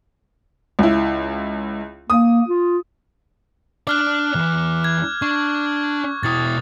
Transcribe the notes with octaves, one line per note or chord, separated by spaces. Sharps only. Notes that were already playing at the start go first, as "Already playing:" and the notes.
C#2 E4
A#3 D#6
F4
D4 D5 D6 F6 F#6
E2 E3
G#6
D4 C#6
B2 E4 D#6 A6